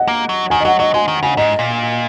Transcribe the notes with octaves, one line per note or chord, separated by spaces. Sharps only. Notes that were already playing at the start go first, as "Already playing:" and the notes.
Already playing: D#5 F#5
A#3
F#3
D#3 G#5
D#5
F#3 F#5
F#3 D#5
G#3 G#5
D#3
C#3 G#5
G#2 D#5
A#2